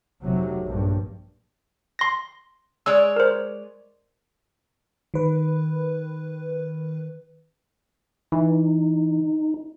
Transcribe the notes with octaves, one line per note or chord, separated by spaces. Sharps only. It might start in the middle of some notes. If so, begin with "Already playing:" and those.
F1 C3 F#3
A#1 G2
C6 A#6
G#3 C#5 D5 E6
A#4 C5
D#3 B4
E3 D#4